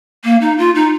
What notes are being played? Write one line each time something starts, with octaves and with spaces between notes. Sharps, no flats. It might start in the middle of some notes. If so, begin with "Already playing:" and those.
A#3
D#4
F4
D#4